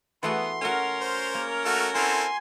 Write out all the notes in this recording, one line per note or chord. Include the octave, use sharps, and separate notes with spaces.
E3 A3 B3 F#4 C6
A3 C#4 F#4 A#4
C5
A#3
A3 F#4 F6
C4 E4 F#4 A4 G#5 C6